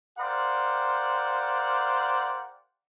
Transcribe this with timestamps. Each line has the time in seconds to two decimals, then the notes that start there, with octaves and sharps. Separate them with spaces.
0.18 G4 A#4 C5 D5 F5 F#5